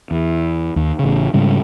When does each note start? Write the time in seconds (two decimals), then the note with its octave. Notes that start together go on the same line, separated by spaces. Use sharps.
0.11 E2
0.76 D#2
0.99 A1 C#3
1.33 G#2 C#3 G3